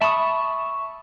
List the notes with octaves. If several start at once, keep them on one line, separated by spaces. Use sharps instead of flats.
E5 A5 B5 C#6 D#6